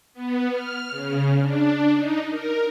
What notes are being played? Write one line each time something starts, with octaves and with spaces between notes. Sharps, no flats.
B3
F6
C#3
D4
D#4
A#4